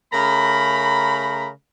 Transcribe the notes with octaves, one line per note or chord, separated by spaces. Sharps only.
C#3 A3 A#4 A#5 B5